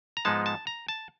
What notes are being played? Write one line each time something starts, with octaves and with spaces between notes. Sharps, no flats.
A#5
G#2 F3 G#3 B3 D#4 A5
A5
A#5
A5